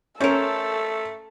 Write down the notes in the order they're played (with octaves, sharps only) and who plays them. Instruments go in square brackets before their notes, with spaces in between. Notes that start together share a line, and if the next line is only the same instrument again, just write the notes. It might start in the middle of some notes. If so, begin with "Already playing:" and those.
[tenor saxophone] A3 [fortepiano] C#4 [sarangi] A4 [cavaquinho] A#4 C5